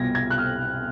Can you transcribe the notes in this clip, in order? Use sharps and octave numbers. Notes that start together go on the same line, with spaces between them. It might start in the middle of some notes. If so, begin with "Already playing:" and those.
Already playing: C2 B2 G3 G#6 A#6
G#6
F#6
F6